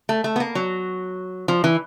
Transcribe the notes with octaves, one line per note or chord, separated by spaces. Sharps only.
A3
A3
B3
A#3
F#3
F3
E3